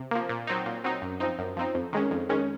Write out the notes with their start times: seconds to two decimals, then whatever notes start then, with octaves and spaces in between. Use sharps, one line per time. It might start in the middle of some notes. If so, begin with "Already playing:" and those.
Already playing: C3
0.11 F3 A#3
0.29 A#2
0.47 F#3 C4 D#4
0.66 A#2
0.84 F#3 C4 D#4
1.02 F#2
1.20 F3 C4 D#4
1.39 F#2
1.57 F3 C4 D#4
1.75 F2
1.93 D#3 G#3 C#4
2.11 F2
2.29 D#3 G#3 C#4